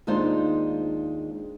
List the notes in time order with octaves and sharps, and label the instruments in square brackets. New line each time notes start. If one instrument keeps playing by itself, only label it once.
[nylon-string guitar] D#2 G#3 D4 D#4 F4 C5